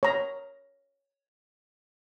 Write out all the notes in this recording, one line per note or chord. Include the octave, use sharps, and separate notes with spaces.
C#5 A#5